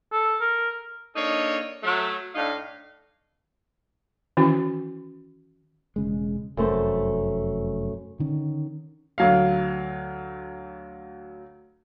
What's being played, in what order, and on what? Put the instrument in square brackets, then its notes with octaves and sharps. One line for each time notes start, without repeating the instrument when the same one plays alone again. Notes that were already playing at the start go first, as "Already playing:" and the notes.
[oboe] A4
A#4
[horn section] A#3 D4 D#4 A4 C#5
F#3 A3
A2 D4 D#4 F5
[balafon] D#3 E3 C#4 E4 F#4
[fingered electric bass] E1 C#3 G#3
[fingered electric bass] F1 [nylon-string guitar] F#2 A3 C5
[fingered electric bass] D3 D#3 C#4
[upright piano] D2 F#3 F5